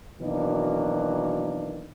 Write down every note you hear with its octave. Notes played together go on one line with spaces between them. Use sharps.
B2 D#3 E3 F#3 A#3 D4